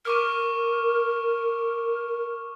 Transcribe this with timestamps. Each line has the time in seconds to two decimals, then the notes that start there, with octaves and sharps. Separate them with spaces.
0.05 A#4 C#6 D6 F6